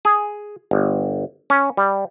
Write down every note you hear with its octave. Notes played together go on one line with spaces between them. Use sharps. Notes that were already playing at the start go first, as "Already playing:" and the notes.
G#4
G1
C#4
G3